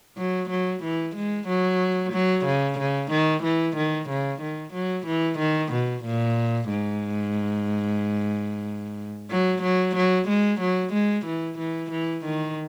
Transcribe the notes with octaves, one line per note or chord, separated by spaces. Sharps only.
F#3
F#3
E3
G#3
F#3
F#3
C#3
C#3
D#3
E3
D#3
C#3
D#3
F#3
E3
D#3
B2
A#2
G#2
F#3
F#3
F#3
G#3
F#3
G#3
E3
E3
E3
D#3